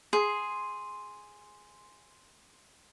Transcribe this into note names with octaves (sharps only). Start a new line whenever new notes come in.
G#4 C6